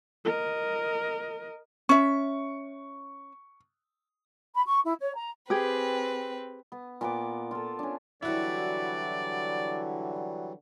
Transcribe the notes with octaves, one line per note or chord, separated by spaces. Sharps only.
A#4 D#5
C#4 E5 C#6
B5
C#6
E4
C#5
A#5
C4 G4 G#4 B4
B3
A#2 B3 D6
F4 A4
C#4 D4
D3 E3 F#3 G3 E4 F#4 D5